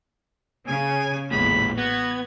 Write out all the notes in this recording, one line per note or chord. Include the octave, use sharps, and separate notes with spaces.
C#3 G#5
A1 E2 A#2 G#3 B5
B3 F#4 G#6